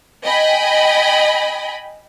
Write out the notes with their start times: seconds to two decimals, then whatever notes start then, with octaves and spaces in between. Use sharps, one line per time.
0.25 D#5 G5 G#5 B5